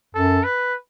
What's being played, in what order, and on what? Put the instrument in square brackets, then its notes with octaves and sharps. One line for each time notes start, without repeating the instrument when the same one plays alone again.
[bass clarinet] F#2 [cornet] A4
[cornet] B4